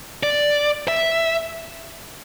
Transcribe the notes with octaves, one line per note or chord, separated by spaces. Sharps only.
D5
E5